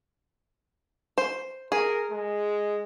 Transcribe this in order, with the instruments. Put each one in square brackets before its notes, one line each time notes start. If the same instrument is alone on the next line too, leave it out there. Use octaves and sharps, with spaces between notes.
[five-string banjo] C5
[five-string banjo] G#4 [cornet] A#4
[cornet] G#3